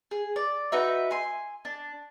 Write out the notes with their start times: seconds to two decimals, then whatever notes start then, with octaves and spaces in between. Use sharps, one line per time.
0.11 G#4
0.36 D5
0.72 D#4 F#4 B4 E5
1.11 G#5 C6
1.65 D4